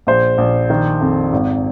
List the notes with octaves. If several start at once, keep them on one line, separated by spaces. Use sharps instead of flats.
A#1 C5
A#1
D#3
F2
G#1